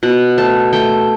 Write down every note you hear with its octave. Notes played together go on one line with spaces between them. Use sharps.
B2 F#5
A3 A5
A3 G5